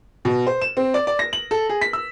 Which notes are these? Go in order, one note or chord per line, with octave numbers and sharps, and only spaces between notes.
B2
C5
E7
C4
D5
D5
A#6
F#7
A4
G#4
B6
E6